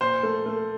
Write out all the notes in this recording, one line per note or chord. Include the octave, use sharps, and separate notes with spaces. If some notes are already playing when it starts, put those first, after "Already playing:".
A#2 C5
A3
A3